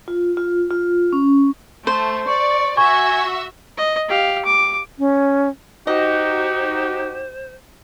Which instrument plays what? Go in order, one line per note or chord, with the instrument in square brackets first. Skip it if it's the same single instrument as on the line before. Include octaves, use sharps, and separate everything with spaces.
[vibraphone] F4
F4
F4
C#4
[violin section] A3 [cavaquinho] C5
[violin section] D5 [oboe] C#6
[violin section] F#4 E5 E6 [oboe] G#5 [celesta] C#6
[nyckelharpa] D#5
G4 F5
D6
[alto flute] C#4
[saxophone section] D#4 F#4 [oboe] G4 [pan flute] C5 [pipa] D#5